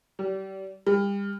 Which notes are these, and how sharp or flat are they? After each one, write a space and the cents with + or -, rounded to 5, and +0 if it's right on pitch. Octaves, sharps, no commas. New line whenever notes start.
G3 -30
G3 +35